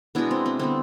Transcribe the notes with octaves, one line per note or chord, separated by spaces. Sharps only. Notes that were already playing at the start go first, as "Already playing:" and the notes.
B2 G#3 B3 D4 E4
C4
C4
D3 G3 B3 C4